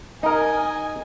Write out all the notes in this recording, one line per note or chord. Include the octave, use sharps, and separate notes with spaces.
D#4 A#4 D#5 G#5